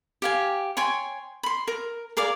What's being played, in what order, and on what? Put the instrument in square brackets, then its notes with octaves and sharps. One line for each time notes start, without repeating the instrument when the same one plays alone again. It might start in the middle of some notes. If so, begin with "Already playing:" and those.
[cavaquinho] G4 F5 G#5
C#5 G5 G#5 C6
B5 C6
A#4
G#4 A#4 D5 F5